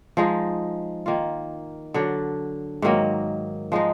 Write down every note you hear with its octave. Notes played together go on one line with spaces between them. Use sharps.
F3 G#3 D#4
D#3 A#3 F4
D3 F#3 D4
G#2 D#3 F#3 A#3
F3 G#3 D#4